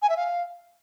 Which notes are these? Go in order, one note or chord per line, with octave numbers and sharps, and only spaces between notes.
G#5
E5
F5